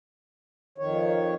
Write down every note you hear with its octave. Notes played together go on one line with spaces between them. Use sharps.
F2 D#3 C#5